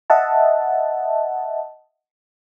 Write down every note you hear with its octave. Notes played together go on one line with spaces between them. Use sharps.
D#5 E5 F#5 A5